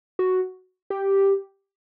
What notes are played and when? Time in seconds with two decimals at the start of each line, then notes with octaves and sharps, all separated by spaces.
0.19 F#4
0.90 G4